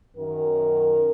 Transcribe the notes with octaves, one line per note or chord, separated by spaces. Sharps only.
F#2 D#3 A#4